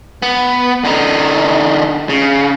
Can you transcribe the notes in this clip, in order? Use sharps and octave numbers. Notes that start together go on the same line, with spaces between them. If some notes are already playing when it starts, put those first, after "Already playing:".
B3
D3 D#4
C#3